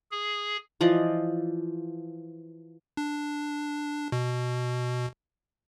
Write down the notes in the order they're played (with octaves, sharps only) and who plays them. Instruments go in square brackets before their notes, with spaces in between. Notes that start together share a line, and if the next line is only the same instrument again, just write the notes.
[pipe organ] G#4
[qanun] E3 F3 D5 D#5
[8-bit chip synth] D4
B2